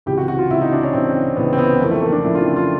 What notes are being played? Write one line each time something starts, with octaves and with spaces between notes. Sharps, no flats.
C#2 C3 E3 G4
F#4
F#4
F4
C#2 C3 E3 E4
D#4
D4
C#4
C#2 C3 E3 C4
C#2 C3 E3 B3
C4
B3
F2 C#3 E3 A#3
A3
A#3
D4
F2 C#3 E3 E4
F4
F4